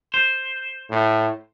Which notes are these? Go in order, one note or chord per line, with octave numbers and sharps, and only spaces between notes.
C5
A2